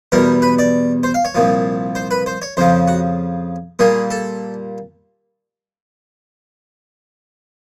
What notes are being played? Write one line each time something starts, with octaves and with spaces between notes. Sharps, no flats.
E2 B2 G3 A#4
B4
D5
C5
F5
C#5
C2 A#2 F3
C5
B4
C5
C#5
F2 C#3 F3 C5
F#4
A#2 G3 A#3 G#4
A4